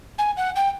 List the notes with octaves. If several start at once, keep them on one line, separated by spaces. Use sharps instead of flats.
G#5
F#5
G5